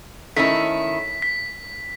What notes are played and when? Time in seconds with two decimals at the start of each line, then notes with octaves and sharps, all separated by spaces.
0.36 D#3 A3 C#4 E4 B6
1.22 B6